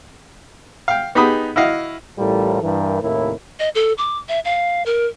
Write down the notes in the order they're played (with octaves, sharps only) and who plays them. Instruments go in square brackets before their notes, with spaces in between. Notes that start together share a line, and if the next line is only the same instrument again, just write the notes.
[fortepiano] F5 G5
B3 D#4 G4 G#4 B5 D#6
E4 F#4 D#5 F5
[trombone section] A1 A2 G3 F4 A4 A#4
G2 E3 A#4
D#2 A2 C3 E4 A#4
[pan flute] D#5
A4
D6
E5
F5
A#4